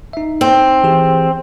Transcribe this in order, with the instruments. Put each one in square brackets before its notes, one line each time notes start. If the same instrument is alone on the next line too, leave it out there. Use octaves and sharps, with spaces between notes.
[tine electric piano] D#4 E5
[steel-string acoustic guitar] C4
[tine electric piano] E3 G4 G#4